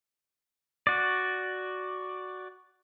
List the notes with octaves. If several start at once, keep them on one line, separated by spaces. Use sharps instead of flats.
F#4 D5